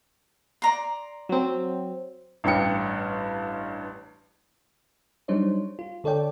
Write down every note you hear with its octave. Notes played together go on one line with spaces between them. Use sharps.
D5 A#5 C6
F#3 C4
A1 G2 G5 C#7
F#3 G3 D4 D#4 C5 C#5
F4
D3 A4 C#5 D5 G5